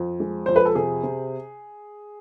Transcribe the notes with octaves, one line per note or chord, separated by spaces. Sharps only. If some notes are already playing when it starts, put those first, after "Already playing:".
Already playing: F2
G#3
F2 C5
B4
A4
C3 G#4
C3